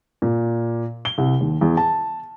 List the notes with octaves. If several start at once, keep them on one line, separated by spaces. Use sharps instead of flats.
A#2
G7
C2
D#2
E2
A5